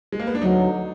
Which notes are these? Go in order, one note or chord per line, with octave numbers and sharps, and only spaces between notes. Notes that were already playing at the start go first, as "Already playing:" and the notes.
G#3
A#3
B3
D4
D2 D3 F#3 D#4